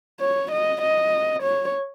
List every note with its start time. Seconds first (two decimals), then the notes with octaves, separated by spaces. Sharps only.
0.20 C#5
0.51 D#5
0.82 D#5
1.43 C#5